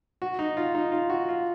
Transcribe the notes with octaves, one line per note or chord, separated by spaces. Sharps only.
F#4
D#4
F4
D#4
F4
F#4
F4